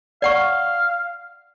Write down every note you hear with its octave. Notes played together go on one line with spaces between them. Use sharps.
D5 F5 F#5 C#6